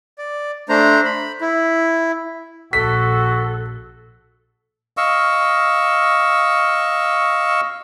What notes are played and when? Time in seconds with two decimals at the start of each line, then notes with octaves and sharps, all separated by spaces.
0.18 D5
0.69 A3 D4 C5 A#5
1.05 B5
1.41 E4
2.73 A#1 F#4 A4 B6
4.97 D#5 F5 C#6 E6